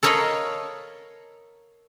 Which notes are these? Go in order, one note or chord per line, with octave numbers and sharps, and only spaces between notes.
A4 A#4 C#5 D#5 F5 B5